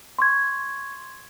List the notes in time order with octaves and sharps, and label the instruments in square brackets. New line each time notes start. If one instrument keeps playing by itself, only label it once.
[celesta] C6 C#6 G#6